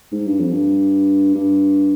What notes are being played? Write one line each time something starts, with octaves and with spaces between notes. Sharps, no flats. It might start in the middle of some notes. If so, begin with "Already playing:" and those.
G#2
G2
F2
G2
G2